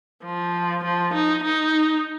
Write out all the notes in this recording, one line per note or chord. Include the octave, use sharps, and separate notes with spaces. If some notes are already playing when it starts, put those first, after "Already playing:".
F3
F3
D#4
D#4